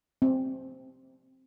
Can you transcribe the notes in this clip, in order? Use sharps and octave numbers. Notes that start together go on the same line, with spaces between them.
C4